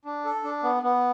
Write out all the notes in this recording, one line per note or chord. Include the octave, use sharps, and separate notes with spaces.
D4
A4
D4
B3
B3